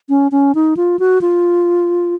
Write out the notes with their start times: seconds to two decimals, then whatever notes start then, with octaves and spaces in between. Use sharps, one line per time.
0.09 C#4
0.32 C#4
0.55 D#4
0.77 F4
0.99 F#4
1.21 F4